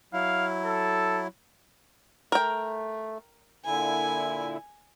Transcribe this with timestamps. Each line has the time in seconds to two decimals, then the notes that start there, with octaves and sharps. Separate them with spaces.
0.13 F#3 E4 F5
0.65 A4
2.32 A3 A#4 G5
3.65 A#2 D3 E4 G#5